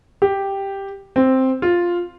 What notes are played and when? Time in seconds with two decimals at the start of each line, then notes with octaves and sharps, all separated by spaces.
0.22 G4
1.16 C4
1.62 F4